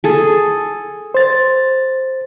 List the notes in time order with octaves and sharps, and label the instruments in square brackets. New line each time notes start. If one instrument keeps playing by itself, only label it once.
[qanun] G#4 A4
[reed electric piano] C5 A6